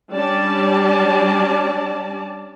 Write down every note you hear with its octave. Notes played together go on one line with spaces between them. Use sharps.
G3 C#4 D4 D5 A5